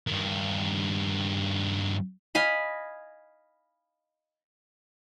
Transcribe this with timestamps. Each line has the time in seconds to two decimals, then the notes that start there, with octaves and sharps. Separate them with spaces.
0.07 G2 D#3
2.35 D#5 F5 G#5 B5